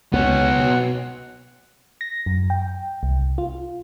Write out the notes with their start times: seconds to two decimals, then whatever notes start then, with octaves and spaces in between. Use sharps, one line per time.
0.13 C#2 B3 C#5 F#5
0.59 B2
2.01 A#6
2.26 F#2
2.50 G5
3.03 C2
3.38 F4